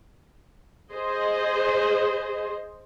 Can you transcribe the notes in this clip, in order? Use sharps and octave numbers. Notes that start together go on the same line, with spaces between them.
G#4 C5 D#5